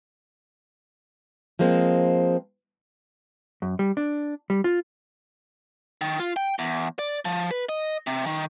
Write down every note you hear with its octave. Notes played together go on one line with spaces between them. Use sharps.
F3 G#3 A#3 C4
F#2
G3
D4
G3
F4
D#3
F4
G5
E2
D5
F3
B4
D#5
C3
D#3